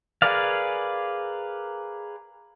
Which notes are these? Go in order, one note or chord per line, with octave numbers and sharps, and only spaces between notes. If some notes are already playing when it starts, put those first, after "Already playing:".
G#4 A#4 B4 D5 F5